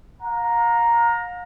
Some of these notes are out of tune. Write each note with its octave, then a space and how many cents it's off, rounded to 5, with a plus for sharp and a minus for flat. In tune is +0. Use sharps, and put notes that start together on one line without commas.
F5 +40 A#5 +0